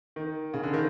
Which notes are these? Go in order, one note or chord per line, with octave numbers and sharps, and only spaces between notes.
D#3
C#3
D3
D#3